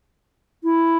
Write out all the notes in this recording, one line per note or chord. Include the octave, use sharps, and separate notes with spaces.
E4